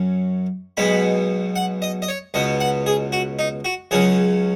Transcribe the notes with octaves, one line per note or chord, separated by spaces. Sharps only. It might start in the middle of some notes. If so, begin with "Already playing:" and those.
Already playing: F#2 F#3 C#4
B1 B2 G#3 B3 B5
F#5
D#5
D#5
C#5
C#2 B2 B3 D#5
F#5
G#4
F#4
D#4
F#4
C#2 C#3 F#3 C#4 G#4